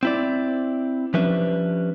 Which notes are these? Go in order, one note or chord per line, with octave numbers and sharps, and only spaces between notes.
C4 E4 D5
F3 G3 C#4 D4 B4 E5